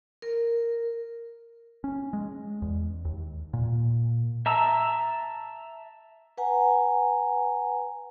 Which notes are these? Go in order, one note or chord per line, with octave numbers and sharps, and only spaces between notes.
A#4
C#4
G#3
E2
D#2
A#2
E5 A5 A#5 E6
B4 F#5 G#5 A#5